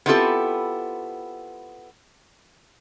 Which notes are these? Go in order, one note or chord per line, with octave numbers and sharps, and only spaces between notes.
B3 C4 E4 F4 G4 A4